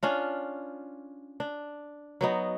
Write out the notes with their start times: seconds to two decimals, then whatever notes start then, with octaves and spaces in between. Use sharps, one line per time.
0.03 C#4 D4 F4
1.40 D4
2.21 F#3 B3 D#4